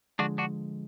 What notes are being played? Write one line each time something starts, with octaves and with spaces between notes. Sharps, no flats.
D3 F3 G#3 D4 F#4
D4 F#4